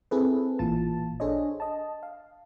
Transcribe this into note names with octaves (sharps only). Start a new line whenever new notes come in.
C4 E4 G#4 A4 B4
A1 A#2 E3 F4 A5
D4 G#4 A4 C5 C#5 D#5
D#5 A5
F5